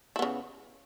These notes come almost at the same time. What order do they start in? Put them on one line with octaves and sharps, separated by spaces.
E4 B3 C#3